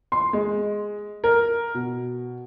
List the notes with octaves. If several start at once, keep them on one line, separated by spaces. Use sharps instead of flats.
C6
G#3
A#4
B2